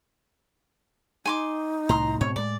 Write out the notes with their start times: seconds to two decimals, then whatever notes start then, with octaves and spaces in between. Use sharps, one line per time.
1.25 D#4 G#5 C6 D6
1.89 C2 A2 A#5 C6
2.21 G#2 B2 C4 C#5
2.36 A2 G#3 D5